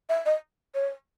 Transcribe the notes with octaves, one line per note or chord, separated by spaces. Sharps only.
E5
D#5
C#5